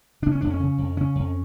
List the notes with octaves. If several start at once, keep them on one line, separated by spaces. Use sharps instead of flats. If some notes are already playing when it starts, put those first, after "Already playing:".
C#3 D4
C#4
F2 D4
C#4
C#3
F2
C#3 C#4
F2